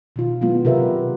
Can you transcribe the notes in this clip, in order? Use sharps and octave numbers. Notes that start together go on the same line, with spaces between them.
B2 D#3 F4
F#3 G#3 B3 E4 F4
C3 G4 A#4 B4 E5